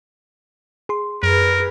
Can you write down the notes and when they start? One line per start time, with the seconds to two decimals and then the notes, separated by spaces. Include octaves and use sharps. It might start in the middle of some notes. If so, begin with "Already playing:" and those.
0.89 G#4 C6
1.23 F#2 G#4 A#4 B4